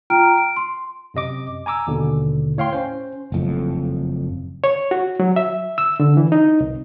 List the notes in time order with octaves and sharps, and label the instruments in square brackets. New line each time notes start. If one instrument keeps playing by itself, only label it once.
[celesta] F4 G5 A#5 F6 D7
D7
C6
[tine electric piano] F#2 C3 D#5 D6
G#5 A#5 D6 E6
D#2 B2 D3
A2 C#5 F5 G5 C6
C#4 C5
[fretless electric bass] F#1 F2 A2
[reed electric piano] C#5
F#4
F#3
E5
E6
D3
E3
D#4
C2